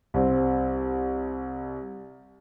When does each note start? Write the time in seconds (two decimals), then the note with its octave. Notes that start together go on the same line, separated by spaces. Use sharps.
0.14 C2 C4